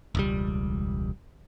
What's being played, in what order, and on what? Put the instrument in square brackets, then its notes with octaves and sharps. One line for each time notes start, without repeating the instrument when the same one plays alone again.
[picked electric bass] E1 C#2 G3